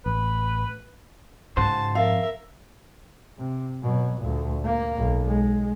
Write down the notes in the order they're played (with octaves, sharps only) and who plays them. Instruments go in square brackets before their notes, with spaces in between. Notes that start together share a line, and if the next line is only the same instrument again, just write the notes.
[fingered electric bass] A1 [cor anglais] B4
[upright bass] G#2 [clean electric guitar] C#3 F#4 C5 [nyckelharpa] A5
[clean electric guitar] F2 [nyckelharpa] A#4 E5 [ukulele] F5
[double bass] C3
B2 F#3
D2 A#2
A#3
B1
G#3